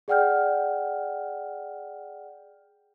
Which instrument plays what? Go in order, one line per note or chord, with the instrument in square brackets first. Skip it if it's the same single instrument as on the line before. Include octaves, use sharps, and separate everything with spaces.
[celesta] G#4 D5 F#5 G5 F6 G6